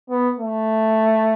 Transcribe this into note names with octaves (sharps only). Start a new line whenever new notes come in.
B3
A3